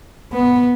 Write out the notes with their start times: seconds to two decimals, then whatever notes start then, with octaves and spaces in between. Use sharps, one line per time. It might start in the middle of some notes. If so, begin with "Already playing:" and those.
0.33 B3